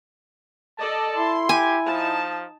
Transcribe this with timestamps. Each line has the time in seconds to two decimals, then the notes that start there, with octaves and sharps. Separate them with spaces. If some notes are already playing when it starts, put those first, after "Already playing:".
0.79 A4 D5 D#5 A5
1.16 E4 C6
1.49 G4 G#5
1.88 F3 D#4 A5